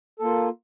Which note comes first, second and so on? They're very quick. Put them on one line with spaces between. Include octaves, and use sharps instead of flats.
A4 A#3 F4